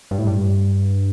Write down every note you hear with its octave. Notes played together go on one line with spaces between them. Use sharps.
G2
A2
G2